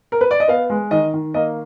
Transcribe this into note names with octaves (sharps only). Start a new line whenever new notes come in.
A#4
B4
D5
D#5
B3 F5
G#3
D#3 D#5
D#3
A#3 D#5